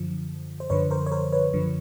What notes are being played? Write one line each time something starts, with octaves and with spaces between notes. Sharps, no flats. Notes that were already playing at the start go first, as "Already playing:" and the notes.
Already playing: F#2 D3 F3
C5
F#2 D3 F3 B4 C#5
A#4 C5
C#5
A#4 C5
B4 C#5
F#2 D3 F3